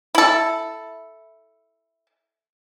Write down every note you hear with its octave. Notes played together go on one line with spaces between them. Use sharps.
E4 A4